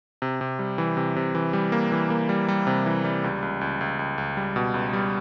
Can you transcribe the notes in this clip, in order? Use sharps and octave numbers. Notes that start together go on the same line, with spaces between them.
C3
C3
G3
E3
C3
C3
E3
G3
A#3
E3
A#3
G3
G3
C3
E3
G3
C#2
C#2
C#2
C#2
C#2
C#2
G3
B2
C#2
G3